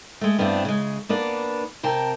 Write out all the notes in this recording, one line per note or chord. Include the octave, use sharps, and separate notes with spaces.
G#3 A3
G2 B3 C4 D4 E4
C#3 G#3
A#3 B3 D4
C3 A#4 G5 A5